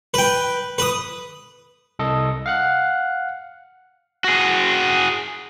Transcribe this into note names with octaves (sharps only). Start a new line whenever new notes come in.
B4 G5
B4 D#6
C2 A4 D#5
F5 F#5 F#6
F#4 G#4